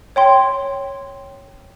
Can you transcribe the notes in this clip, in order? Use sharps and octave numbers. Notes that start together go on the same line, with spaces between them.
C#5 G5 C6